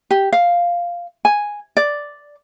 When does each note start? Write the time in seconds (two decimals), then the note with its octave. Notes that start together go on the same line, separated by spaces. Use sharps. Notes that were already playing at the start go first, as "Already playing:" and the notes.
0.11 G4
0.33 F5
1.25 G#5
1.77 D5